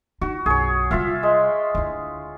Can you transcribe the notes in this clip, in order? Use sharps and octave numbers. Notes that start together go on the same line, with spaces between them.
D#4 F#4
B1 F#2 G#4 C#5
C3 G3 F4 E5 F5
G#3
D2 E4